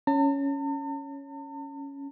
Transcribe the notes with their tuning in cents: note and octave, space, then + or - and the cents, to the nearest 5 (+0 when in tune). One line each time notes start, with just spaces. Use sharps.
C#4 +5 A5 +45